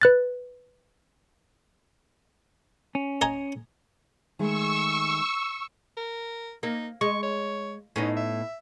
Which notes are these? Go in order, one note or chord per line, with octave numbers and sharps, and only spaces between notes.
B4 F#6 A6
C#4
D#5 G#5 A#5
D#3 G#3 A3 C#6 E6
A#4
A#3 D#4
G#3 C#6
C#5
A2 B3 C#4 D#4
E5